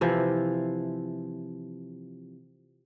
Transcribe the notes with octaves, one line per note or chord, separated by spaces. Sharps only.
C3 E3 F3